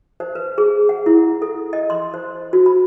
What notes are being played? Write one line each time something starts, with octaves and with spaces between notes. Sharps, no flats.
C5
B4
G#4
F#5
E4
A4
D#5
C6
C5
F#4
B5